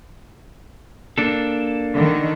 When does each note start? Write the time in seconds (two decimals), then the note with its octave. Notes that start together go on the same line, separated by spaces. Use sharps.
1.18 A#3 D4 A4
1.94 D3 D#3